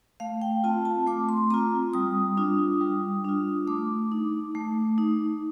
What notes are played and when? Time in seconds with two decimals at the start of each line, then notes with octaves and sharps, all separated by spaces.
0.20 A3 F5
0.41 G5
0.64 C4 F4 A5
0.85 A5
1.07 A3 D6
1.29 C6
1.50 C4 F4 A#5
1.94 G3 D#6
2.37 D4 F4
2.81 G3
3.24 D4 F4
3.67 A3 D6
4.12 D#4
4.55 A3
4.98 D#4